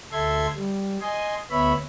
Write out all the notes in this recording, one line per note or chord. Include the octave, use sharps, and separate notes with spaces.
D2 A4 E5 C6 G#6
G3
D#5 G#5 C6
D2 B3 C#5 E5 B5